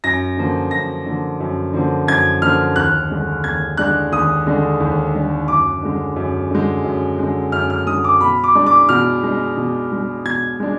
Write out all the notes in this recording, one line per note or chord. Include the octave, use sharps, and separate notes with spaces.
F#2 A#6
D3 F3 A#3
F#2 A#6
D3 F3 A#3
F#2
D3 F3 A#3
F#2 G#6
D3 F3 A#3 F6
D#2 F#6
D3 G#3 D4
D#2 G#6
D3 G#3 D4 F#6
D#2 D#6
D3 G#3 D4
D#2
D3 G#3 D4
F#2 D6
D3 G#3
F#2
D3 G#3
F#2
D3 G#3
F#2 F6
F6
D3 G#3 D#6
D6
B2 B5
D6
G#3 D4
D6
B2 F6
G#3 D4
B2
G#3 D4
B2 G#6
G#3 D4